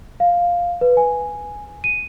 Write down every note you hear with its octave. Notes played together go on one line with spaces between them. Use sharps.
F5
B4
G#5
D#7